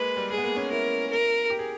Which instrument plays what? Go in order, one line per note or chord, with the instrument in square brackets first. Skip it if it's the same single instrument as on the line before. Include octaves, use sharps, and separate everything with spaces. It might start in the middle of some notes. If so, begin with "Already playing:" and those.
Already playing: [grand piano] G#3 A#3 [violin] B4
[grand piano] G3
[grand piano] G#3 [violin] G#4
[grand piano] B3
A#3
C#4
[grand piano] E4 [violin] A#4
[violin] A#4
[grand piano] G4
G#4